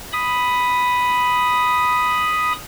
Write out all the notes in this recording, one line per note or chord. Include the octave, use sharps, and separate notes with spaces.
B5 D#6